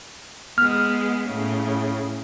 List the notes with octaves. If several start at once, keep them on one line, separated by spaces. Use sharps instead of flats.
G#3 B3 F6
A2 C#3